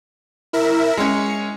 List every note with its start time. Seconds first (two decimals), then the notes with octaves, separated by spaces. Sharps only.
0.53 E4 A#4 E5
0.97 G#3 C#4 C#7